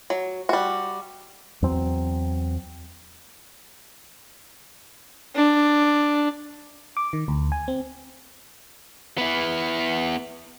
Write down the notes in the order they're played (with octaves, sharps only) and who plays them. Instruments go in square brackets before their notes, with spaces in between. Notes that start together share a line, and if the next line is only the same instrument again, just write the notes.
[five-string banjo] F#3
G3 F#4
[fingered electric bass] E2 F#3 C4
[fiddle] D4
[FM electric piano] D6
D#3
D2
G#5
C4
[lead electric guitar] B3 E4